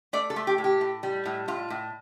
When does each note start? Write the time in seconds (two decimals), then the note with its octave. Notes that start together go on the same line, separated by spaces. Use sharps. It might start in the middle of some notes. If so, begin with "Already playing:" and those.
0.13 A3 D5
0.30 A4
0.36 A3
0.47 G4
0.58 A2
0.64 G4
0.81 A2
1.03 G3
1.25 A2
1.48 A2 F4
1.70 A2